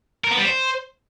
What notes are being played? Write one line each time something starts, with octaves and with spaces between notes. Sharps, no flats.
A#4
B3
G3
C5